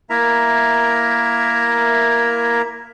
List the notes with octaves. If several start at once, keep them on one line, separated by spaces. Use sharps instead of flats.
A#3 E4 A#4 E5 A#5